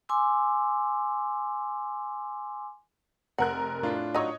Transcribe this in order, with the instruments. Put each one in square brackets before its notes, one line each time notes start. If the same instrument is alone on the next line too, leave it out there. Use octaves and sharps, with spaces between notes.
[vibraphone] G#5 C6 D6 E6
[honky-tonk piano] F1 A#4 F#6 [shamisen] F#5
[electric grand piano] A2 D4 F4
[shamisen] F#3 D#4 [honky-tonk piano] C#5 D#5